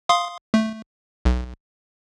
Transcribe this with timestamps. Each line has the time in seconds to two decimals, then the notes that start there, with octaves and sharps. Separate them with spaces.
0.09 F5 C6 D#6
0.54 A3
1.25 B1